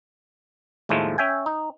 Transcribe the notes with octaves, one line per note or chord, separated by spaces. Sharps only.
D#2 A2 F3 G#3 A3
C#4 E5 G5 G#5
D#4